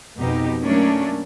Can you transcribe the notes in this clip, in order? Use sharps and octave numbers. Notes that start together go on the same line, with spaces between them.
F2 B2 D#4 G4
F#3 A3 A#3 C#4 D4